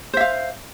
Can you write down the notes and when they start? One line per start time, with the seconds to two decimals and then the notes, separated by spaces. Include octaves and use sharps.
0.13 C5
0.17 E5
0.21 F5